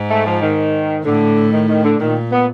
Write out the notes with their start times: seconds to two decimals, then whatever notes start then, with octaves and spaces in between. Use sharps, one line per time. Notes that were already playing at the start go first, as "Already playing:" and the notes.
Already playing: G#2
0.10 A3
0.26 F3
0.42 D#3
1.04 A2 D3
1.52 D#3
1.68 D#3
1.84 D3
1.99 A#2 D#3
2.31 B3